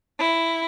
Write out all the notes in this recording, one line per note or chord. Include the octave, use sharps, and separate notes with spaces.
E4